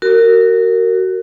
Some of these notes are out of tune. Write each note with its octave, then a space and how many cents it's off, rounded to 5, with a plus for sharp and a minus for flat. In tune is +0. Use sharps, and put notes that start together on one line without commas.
F#4 +20 A#4 -20